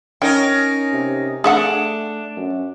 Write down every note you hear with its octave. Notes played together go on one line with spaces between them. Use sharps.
C#4 D#4 A#4 G5
C3
A3 D4 G#4 E5 F#5
F#2